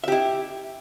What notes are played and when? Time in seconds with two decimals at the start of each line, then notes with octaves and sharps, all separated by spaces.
0.04 E5
0.08 G4
0.12 E4